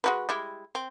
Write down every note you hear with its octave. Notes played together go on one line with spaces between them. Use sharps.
G#3 F#4 B4
G3 G#3 E4
C4